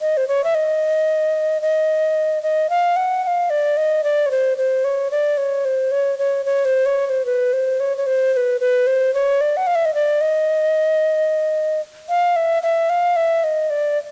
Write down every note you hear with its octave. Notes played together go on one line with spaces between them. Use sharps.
D#5
C5
C#5
E5
D#5
D#5
D#5
F5
F#5
F#5
F5
D5
D#5
D5
C#5
C5
C5
C#5
D5
C#5
C5
C#5
C#5
C#5
C5
C#5
C#5
C5
B4
C5
C#5
C#5
C5
C5
B4
B4
C5
C#5
D5
F#5
F5
E5
D#5
D5
D#5
F5
E5
E5
F5
E5
D#5
D5